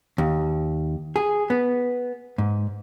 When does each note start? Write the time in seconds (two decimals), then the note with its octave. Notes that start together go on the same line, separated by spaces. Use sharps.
0.18 D#2
1.16 G#4
1.50 B3
2.38 G#2